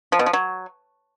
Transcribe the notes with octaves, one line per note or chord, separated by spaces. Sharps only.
F3
B2
F3
F#3